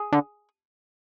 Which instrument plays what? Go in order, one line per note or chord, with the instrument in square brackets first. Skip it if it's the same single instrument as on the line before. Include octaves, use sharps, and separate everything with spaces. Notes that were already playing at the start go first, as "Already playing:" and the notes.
Already playing: [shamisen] G#4
[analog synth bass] D3